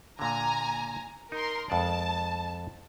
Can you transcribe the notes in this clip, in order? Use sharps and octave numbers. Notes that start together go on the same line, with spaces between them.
A#2 D3 G#5 A#5
D#4 A#4 C6
F2 G#3 D5 A5